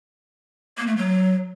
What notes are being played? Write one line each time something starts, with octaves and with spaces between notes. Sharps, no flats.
A#3
A3
F#3